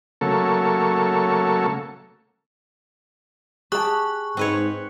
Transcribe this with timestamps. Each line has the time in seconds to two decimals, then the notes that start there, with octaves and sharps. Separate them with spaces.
0.21 C#3 F#3 A3 A#3 A4 C#6
3.72 G4 G#4 A5 C#6 F#6
4.37 G#2 C4 B4 C#5